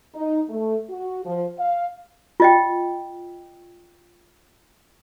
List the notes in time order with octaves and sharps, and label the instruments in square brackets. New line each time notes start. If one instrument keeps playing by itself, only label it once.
[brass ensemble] D#4
A3
F#4
F3
F5
[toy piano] F4 D#5 G5